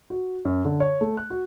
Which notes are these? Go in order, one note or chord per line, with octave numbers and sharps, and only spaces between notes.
F#4
F#2
D3
C#5
A3
F#6
F#4